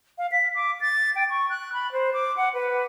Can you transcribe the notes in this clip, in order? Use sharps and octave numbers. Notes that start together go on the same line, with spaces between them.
F5
B6
D6
A6
G5
C#6
F#6
B5
C5
D6
F#5
B4